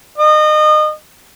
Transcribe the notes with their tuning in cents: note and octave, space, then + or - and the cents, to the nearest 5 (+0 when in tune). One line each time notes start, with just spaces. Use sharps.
D#5 -30